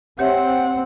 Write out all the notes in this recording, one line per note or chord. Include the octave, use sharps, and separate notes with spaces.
C4 G4 C#5 E5 F#5